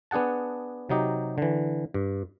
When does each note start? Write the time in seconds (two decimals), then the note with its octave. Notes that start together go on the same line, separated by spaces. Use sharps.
0.11 B3 D4 G#4 F#5 A5
0.89 C3 F#3 D#4 G4
1.38 D3 E3
1.94 G2